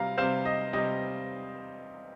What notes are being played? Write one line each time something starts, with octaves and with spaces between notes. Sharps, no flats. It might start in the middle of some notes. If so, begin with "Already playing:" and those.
Already playing: C3 G3 C4 F5 A#5
C3 G3 C4 C5 F5
D#5
C3 G3 C4 D#5